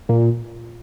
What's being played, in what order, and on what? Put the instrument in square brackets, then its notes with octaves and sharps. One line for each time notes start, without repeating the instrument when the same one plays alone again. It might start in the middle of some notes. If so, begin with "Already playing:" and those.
[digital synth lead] A#2